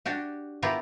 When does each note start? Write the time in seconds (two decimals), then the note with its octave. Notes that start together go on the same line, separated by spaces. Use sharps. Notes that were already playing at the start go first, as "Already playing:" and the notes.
0.06 D4 F#4 G4
0.62 B3 E4 F4 G4 A#4